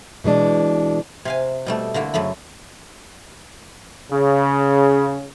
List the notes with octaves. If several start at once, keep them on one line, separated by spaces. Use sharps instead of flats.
B2 E3 G#3 D4
C3 F5 G#5
B2 G3 A3
D3 A3 A#3 E4
F#2 C#3 A3 B5
C#3